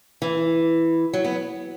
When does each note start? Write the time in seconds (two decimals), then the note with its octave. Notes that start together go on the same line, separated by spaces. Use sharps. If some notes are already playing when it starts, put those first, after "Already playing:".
0.22 E3
1.13 F#3
1.25 B3